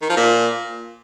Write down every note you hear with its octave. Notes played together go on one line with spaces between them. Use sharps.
D#3
F3
A#2